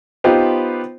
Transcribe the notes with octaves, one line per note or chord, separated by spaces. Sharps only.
B3 D#4 F4 G4 B4 C5